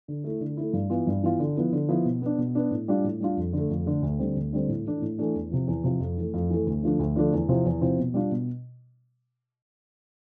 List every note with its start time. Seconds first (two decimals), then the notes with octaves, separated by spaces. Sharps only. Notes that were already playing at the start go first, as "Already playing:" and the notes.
0.08 D3
0.24 A3 E4
0.41 D3
0.57 A3 E4
0.73 G2
0.90 E3 B3 F4
1.07 G2
1.23 E3 B3 F4
1.39 D3
1.56 F3 B3 E4
1.73 D3
1.89 F3 B3 E4
2.05 B2
2.22 B3 D4
2.38 B2
2.55 B3 D4
2.71 A2
2.88 G3 D4 F4
3.04 A2
3.20 G3 D4 F4
3.37 F2
3.53 D3
3.58 A3
3.70 F2
3.86 D3 A3
4.02 D2
4.19 D3 G3 C4
4.36 D2
4.53 D3 G3 C4
4.69 A2
4.85 E3 A3 D4
5.02 A2
5.19 E3 A3 D4
5.35 E2
5.51 C3 F3
5.67 E2
5.84 C3 F3
6.00 F2
6.17 E3 A3
6.34 F2
6.50 E3 A3
6.66 D2
6.83 D3 F3 A3 D4
6.99 D2
7.16 D3 F3 A3 D4
7.33 E2
7.49 C3 F3 C4 E4
7.65 E2
7.81 C3 F3 C4 E4
7.98 B2
8.14 G3 D4 F4
8.31 B2